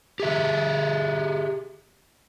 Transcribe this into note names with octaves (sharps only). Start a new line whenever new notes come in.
G4 G#4 E5